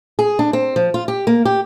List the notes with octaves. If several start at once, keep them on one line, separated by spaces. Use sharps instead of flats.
G#4
D4
C4
F3
F4
G4
A#3
G4